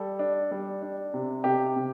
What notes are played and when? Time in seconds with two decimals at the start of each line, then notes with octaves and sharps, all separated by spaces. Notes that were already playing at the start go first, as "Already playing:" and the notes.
Already playing: G3 A4
0.19 D4
0.51 G3
0.82 D4
1.14 C3
1.44 C3 G4
1.76 C3